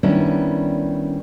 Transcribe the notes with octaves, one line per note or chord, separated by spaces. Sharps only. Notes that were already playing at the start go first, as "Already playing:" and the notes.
D#3 G3 B3 C#4 D4 E4